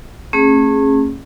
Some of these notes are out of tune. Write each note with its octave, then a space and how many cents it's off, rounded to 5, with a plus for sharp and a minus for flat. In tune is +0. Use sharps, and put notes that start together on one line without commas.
A3 +30 C#4 -30 G#4 +0